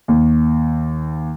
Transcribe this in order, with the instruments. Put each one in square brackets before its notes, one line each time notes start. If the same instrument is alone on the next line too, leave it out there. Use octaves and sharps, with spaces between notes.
[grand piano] D#2